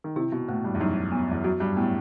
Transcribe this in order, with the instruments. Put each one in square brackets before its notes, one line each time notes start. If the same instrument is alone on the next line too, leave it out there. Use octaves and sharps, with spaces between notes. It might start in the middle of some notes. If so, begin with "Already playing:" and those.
[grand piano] D#3
[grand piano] C3 [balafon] E4
[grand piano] B2
[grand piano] A2 [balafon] A3
[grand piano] G2
E2
[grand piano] F#2 [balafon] D#4
[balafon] B3
[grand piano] E2
[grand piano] F#2 [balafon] F#4
[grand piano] G2
[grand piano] A2 [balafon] B3